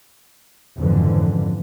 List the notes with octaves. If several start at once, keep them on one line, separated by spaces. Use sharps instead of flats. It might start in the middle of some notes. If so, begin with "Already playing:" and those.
F#1 F2 G#2 D3 E3 F3